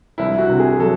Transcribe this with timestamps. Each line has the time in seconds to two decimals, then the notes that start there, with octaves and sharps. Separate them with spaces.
0.18 C2 E4
0.38 F#4
0.50 C3
0.60 G#4
0.79 F#3 A4